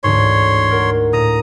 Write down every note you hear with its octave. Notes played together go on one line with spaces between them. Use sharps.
A1 D2 G#2 C#5 C6
A#4 F#5
A2 A#5 D#6